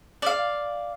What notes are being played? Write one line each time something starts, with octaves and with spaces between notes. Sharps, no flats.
D5 F5